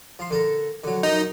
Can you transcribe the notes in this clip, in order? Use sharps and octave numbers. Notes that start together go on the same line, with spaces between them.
F3 C6
D3 A4 A#4
D3 F#3
F#2 D#4